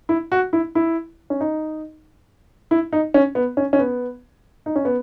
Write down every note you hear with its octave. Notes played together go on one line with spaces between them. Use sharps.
E4
F#4
E4
E4
C#4
D#4
E4
D#4
C#4
B3
C#4
C#4
B3
D#4
C#4
B3